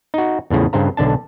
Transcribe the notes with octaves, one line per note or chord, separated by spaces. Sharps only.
D#4 F#4
E2 A2 C#3 F3
G2 C#3 C5 F5 A#5
B1 D3 D4 A5